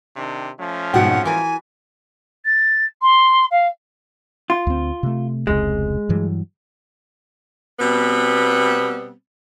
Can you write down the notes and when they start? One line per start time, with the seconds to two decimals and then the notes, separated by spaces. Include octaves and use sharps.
0.16 C3 D#3 D4
0.58 F3 A3 C#4
0.94 F2 G#2 B2 F#4 F#5 G5
1.25 E3 A#4 G#5
2.45 A6
3.02 C6
3.51 F5
4.50 F4
4.67 D2 C4
5.03 C3 A3
5.47 F1 C#2 C3 G#3
6.09 G2 E3 F#3
7.80 B2 G3 B3 C4